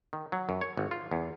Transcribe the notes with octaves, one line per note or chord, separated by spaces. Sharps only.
D#3
F#3
F#2
C#5
G#1
F4
E2